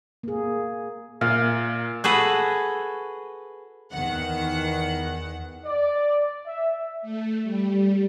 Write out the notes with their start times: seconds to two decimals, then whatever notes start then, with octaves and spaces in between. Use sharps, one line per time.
0.23 A#3 G#4
1.21 A#2 F5
2.04 F#4 G#4 A4 B4
3.93 E2 D#3 F#5
5.65 D5
6.46 E5
7.02 A3
7.43 G3